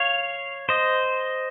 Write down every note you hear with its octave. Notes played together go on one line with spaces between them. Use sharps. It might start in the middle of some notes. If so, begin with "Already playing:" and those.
Already playing: C#5 F5
C5 D#5